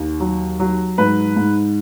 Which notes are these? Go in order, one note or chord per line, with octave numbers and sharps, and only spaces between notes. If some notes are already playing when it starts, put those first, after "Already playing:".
Already playing: D#2 D#3
F#3
F#3
G#2 B4
G#2